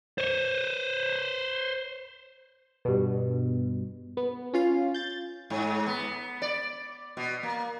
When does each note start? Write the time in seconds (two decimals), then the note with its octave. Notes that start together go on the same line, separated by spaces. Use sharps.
0.18 C5 C#5
2.85 G2 B2
4.17 B3
4.54 C#4 F4 F5
4.94 G6 A6
5.50 G#2
5.87 B3
6.42 D5
7.17 B2
7.43 A#3